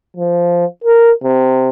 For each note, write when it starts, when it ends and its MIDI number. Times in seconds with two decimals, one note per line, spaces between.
0.17 0.65 53
0.84 1.12 70
1.24 1.70 48